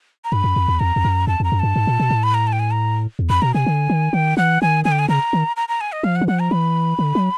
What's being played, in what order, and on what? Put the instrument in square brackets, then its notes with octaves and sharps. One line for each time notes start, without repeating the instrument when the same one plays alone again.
[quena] A#5
[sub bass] G2 [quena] B5
[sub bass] F#2
F2
E2
[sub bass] F2 [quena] A#5
[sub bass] F2
F#2
[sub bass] F2 [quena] A5
[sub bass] F2 [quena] A#5
[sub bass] F#2
[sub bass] G2 [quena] A5
[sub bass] G#2
A#2
B2
A2
[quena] B5
A#5
A5
G5
G#5
A#5
[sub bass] E2
[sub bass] F2 [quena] B5
[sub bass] B2 [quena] A#5
[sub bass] C3 [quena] G#5
[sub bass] D3
D#3
[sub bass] D#3 [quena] G5
[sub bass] E3 [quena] F#5
[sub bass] D#3 [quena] G#5
[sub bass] D3 [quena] G#5
[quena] G5
G#5
[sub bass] C#3 [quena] A#5
[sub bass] D#3
[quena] A#5
A#5
G#5
D#5
[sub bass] F3 [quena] F5
[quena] F#5
[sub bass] E3
[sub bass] F3 [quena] F#5
[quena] A#5
[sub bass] E3 [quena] B5
[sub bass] D3
F#3